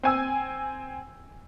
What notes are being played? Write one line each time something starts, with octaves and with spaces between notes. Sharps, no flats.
C4 G#5 E6